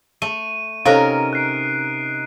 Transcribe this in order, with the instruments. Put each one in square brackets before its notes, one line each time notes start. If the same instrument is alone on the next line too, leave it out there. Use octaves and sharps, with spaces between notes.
[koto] A3 [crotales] D#7
[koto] C3 C#4 A#4 [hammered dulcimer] D#4 [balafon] A4 F5
[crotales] F#6 C7 D7